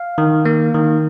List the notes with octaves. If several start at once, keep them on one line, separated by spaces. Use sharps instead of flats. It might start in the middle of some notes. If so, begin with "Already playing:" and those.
Already playing: F5
D#3
A#3
D#3